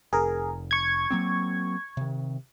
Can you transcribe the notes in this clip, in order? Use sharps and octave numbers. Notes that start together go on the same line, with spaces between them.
F1 G#4 A#4
C#6 G#6
F#3 A#3 C4
C3 D#3